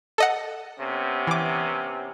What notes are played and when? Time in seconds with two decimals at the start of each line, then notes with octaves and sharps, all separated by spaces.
0.18 A4 D#5 F#5
0.79 C3 B3 C#4
1.27 E3 D6